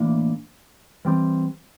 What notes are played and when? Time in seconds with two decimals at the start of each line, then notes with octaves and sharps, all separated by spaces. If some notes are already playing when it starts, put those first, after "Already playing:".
Already playing: A2 E3 A#3 D4
1.05 E3 G3 C4